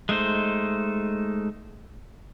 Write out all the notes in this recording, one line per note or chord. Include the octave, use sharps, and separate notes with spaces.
G#3 A3 D#4 C5